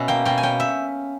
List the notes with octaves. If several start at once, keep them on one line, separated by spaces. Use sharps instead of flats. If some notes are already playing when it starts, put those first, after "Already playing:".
Already playing: B2 C#4 E5
A#3 G5
B2 G5
G#5
C#4 G5
E5